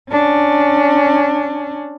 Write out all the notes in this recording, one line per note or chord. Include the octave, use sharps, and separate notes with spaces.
C#4 D4